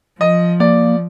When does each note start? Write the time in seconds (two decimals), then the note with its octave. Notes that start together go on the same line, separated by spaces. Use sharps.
0.21 F3 D#5
0.60 A#3 D5